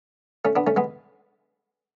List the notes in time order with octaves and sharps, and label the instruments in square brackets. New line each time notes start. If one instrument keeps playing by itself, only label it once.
[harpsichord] A3 C#4
B3 D4
A3 C#4
G#3 B3